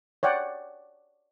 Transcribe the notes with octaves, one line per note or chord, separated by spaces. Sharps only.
C#5 D5 F#5 G5